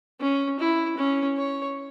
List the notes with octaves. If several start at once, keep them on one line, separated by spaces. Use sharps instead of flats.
C#4
E4
C#4
C#5